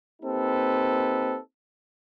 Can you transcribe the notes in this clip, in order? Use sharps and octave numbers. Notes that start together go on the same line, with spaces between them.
A#3 C4 D#4 G4 A4 B4